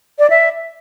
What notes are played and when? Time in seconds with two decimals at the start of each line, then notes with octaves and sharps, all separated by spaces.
0.19 D5
0.30 E5